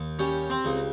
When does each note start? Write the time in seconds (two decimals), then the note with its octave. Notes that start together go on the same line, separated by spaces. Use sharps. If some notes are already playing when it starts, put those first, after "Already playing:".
Already playing: D#2
0.19 G3 C#4
0.50 C4
0.65 C#2